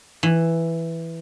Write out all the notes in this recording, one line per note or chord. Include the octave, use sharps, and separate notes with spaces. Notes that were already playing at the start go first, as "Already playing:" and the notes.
E3